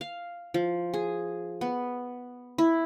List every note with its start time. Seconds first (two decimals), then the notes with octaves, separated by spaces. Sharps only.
0.01 F5
0.54 F3
0.94 G#4
1.61 B3
2.58 E4